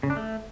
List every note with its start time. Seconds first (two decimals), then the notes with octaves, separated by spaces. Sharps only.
0.03 C#3
0.10 D4
0.17 A3